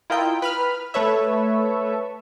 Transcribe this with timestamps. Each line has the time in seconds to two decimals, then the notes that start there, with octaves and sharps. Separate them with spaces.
0.10 E4 F4 A#4 D#5 G5
0.42 B4 B5 F6
0.94 A3 A4 B4 C#5 E5